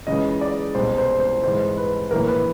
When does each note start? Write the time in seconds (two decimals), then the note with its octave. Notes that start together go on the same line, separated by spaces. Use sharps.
0.07 C#2 C#3 E3 D#5
0.41 D5
0.75 C2 B2 C5
0.98 C5
1.20 C5
1.43 G#1 G#2 E3 C5
1.77 B4
2.11 A#1 A2 E3 A#4
2.27 B4